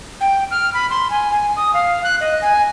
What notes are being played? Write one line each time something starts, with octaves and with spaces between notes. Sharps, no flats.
G5
F6
B5
C6
G#5
G#5
D#6
F5
F#6
D#5
G#5